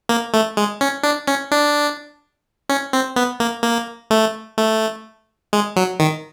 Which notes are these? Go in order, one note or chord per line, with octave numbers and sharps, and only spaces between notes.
A#3
A3
G#3
C#4
D4
C#4
D4
C#4
C4
B3
A#3
A#3
A3
A3
G#3
F#3
D#3